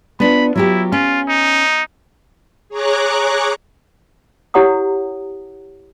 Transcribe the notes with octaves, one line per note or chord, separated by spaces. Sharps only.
B3 D4 F4 B5
F#3 E4 F4 G4
C#4 F4
D#4
G#4 C#5 A#5 C#6 D6 F#6
E4 G4 C#5 F#5 A#5 D#6